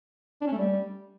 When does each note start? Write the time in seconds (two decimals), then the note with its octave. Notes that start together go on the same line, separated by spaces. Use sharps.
0.41 D4
0.47 C#4
0.52 A3
0.57 G3